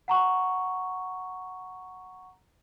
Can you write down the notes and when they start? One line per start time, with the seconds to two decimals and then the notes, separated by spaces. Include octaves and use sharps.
0.08 F#5 A#5 C#6